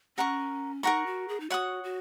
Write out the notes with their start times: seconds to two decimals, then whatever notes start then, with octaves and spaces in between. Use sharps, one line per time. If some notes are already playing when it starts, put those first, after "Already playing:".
0.17 C#4 A#4 F#5 A#5 C#6
0.83 D#4 A#4 F#5 A#5 C#6
1.06 F#4
1.28 G#4
1.40 D#4
1.50 F#4 C#5 F#5 D#6
1.84 F#4